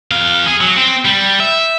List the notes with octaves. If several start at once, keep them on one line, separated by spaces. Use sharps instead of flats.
F2 F5
G#4
F#3
C4
G3
E5